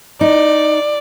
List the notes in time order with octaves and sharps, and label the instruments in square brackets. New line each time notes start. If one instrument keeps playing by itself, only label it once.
[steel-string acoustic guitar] D#4 [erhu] D5